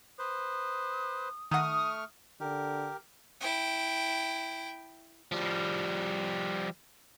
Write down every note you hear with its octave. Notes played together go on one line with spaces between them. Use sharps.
B4 C5 D#6
D#3 A3 F#5 C#6 D#6 F6
D3 G4 A#4
E4 G5
F3 G3